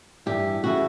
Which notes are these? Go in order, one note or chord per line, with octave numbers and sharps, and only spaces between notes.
G2 E3 G4
C#3 E3 F#4